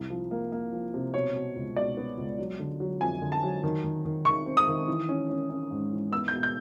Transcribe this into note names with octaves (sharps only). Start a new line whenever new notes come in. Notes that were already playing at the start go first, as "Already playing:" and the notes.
Already playing: C2
F3
A#3
A#3
F3
C3
B2 C#5
B2
C#2
B2 D5
B3
C#2
F#3
D3
F#3
F2 G#5
D3
A5
F#3
D#3
D#3
D#3
D#3 C#6
C4
D#6
D#3
E3
C#4
C#4
C#4
G#2
E3
B3 E6
G6
B2
G6